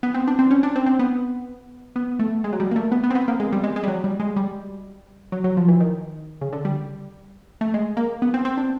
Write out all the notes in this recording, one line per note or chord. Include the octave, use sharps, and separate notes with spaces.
B3
C4
D4
C4
C#4
D4
C4
C4
B3
B3
A3
G#3
F#3
G3
A#3
A3
B3
B3
C4
B3
A#3
G#3
G3
G#3
G#3
G3
F#3
G3
G#3
G3
F#3
F#3
F3
E3
D#3
C#3
D3
G3
A3
G#3
A#3
B3
C4
C4
D4